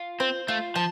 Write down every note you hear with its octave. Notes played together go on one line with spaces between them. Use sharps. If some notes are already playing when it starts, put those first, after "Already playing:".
Already playing: F4
C4 C5
A3 F4
F3 A5